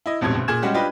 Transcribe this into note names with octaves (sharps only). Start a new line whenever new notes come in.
E4 D#5
D#1 A1 F2 G#2 B2 G#6
F#1
A#2 G#4 G#6 E7
G3 G#3 C#4 F#4 G4
D4 F4 G4 B4 D#5